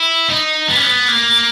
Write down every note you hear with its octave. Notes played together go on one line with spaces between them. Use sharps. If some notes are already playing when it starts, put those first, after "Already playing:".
Already playing: E4
D#4
B3
C#4
B3
A#3